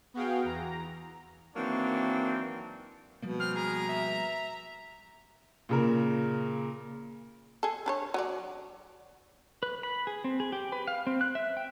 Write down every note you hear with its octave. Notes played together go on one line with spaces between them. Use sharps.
B3 F#4 G#4 F5 G5
E2 A#5
D#3 E3 F#3 A#3 C4 D4
B2 F3 G3 A#3
C4 F6
G#4 A#5
E5
A#2 C#3 A#4
G#4 A4
D4 B4 C#5
F#3 C#5 D5
B4
B5
G#4
C4
G#4
G4
B4
F5
C4
F#6
E5
G5